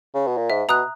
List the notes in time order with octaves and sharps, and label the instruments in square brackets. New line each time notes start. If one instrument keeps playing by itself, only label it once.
[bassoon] C#3
B2
A#2
[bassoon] G#2 [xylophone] E5
[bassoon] B2 [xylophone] A#5 D#6 F#6